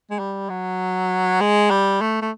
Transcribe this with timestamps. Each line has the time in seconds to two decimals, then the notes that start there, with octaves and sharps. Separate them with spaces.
0.10 G#3
0.19 G3
0.50 F#3
1.41 G#3
1.71 G3
2.01 A3
2.22 A3